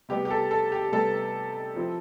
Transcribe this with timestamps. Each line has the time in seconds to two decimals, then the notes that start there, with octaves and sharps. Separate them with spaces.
0.09 C3 G3 B3 G4
0.25 G4
0.30 A4
0.51 A4
0.72 G4
0.92 C3 G3 B3 A4
1.75 F3 C4 E4